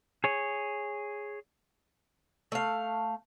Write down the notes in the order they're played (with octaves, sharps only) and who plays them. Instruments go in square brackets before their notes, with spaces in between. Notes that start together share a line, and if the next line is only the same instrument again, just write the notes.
[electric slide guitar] G#4 C#5
[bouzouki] A3 F5